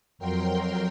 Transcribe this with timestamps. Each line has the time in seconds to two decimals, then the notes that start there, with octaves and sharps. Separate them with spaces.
0.18 F2 F#3 A#4 G5 C6